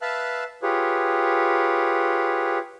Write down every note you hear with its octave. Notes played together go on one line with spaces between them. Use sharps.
B4 E5 F5 A5 E6 F#6
F4 G4 G#4 B4 C#5